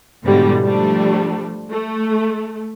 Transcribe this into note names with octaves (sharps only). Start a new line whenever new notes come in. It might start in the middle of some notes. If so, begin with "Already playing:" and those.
G#2 B2 D3 E3 G3
F3 G3 A3 D4
A3